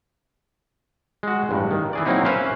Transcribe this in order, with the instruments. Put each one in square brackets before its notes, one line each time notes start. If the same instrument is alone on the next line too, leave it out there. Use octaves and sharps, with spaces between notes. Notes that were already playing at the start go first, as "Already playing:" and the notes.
[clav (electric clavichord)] G#3 F#4
A1 G2
D#3
E3 G#4 D5
F#3 A#3 C4 D#4 E4
C#4 B4 C5 E5 F5